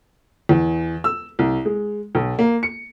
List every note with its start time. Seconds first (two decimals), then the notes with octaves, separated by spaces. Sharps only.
0.49 E2
1.04 E6
1.39 C2
1.65 G#3
2.15 B1
2.39 A#3
2.63 C#7